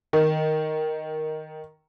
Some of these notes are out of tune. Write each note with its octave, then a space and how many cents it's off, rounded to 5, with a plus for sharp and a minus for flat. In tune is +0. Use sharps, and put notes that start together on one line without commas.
D#3 +0